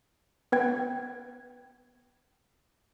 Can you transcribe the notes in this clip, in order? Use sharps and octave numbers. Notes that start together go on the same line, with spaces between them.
B3 B4 G5 G#6